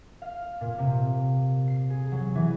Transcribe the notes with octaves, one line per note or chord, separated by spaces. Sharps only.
F5
A#2
C3
C7
G#4
F#3
E3